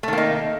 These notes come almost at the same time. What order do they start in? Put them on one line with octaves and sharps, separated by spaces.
A3 D#3 A#3 D#4